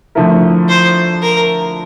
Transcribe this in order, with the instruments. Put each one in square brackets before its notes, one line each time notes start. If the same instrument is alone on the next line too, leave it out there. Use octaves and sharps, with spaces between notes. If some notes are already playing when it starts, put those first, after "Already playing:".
[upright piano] D3 F3 A3 E4 A#4
[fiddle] C5
A#4